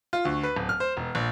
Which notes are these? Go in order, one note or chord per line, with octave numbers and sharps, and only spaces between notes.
F4
D2
B4
D1
F6
C5
E1
A#1